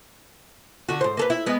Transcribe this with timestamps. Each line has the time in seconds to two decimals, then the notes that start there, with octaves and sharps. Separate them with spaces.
0.89 D3 F#4
1.01 G#2 C5
1.17 A#3 A4 B4
1.30 E4
1.46 G#3 B3